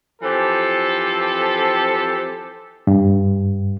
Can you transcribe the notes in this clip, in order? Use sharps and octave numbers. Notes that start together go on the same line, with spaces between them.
E3 F3 C4 G4 A4
G2